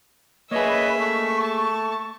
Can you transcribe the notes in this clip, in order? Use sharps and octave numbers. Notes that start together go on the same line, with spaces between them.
A#3 G#4 B4 C#5 D#5 E5
A3 C#6
A5